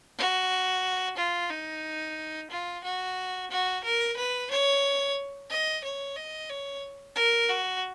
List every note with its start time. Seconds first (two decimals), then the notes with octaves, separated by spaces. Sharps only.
0.18 F#4
1.17 F4
1.50 D#4
2.50 F4
2.84 F#4
3.50 F#4
3.84 A#4
4.16 B4
4.51 C#5
5.50 D#5
5.84 C#5
6.16 D#5
6.49 C#5
7.16 A#4
7.49 F#4